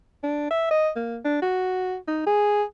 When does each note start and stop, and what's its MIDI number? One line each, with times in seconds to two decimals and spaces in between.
0.24 0.50 62
0.51 0.69 76
0.71 0.90 75
0.96 1.18 58
1.25 1.41 62
1.42 1.96 66
2.08 2.25 63
2.27 2.63 68